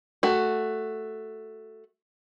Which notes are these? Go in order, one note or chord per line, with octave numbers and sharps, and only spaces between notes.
A3 F#4